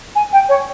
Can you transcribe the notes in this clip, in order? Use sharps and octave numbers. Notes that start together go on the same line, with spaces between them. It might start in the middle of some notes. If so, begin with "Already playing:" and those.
G#5
G5
C#5